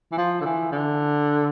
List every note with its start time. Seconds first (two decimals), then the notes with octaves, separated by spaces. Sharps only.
0.12 E3
0.18 F3
0.41 D3
0.45 E3
0.72 D3